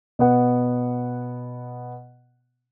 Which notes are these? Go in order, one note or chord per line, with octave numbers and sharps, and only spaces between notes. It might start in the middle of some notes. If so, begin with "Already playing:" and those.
B2 B3 F#5